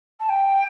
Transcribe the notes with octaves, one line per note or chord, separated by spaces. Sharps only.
A5
G5